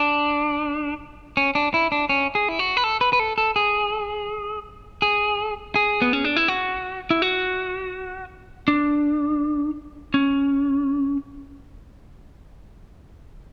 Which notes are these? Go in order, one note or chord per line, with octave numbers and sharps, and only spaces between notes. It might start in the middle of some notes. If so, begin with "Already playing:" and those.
Already playing: D4
C#4
D4
E4
D4
C#4
G#4
E4
F#4
B4
A4
B4
B4
A4
A4
G#4
G#4
G#4
B3
C#4
D4
E4
F#4
E4
F#4
D4
C#4